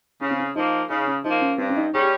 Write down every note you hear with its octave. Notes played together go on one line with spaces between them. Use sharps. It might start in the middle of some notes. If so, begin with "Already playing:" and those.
C#3 C#4
C4
C#4
F3 A#3 D#4
C#3 D#4
C#4
F3 A#3 D#4
C#4
G2 C4
C#4
D#4
G3 C#4 G#4
G4